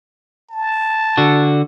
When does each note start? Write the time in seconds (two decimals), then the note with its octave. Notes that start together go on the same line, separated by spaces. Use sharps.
0.51 A5
1.17 D3 F#4